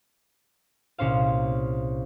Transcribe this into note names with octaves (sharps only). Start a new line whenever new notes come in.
C2 A#2 C#4 C5 F5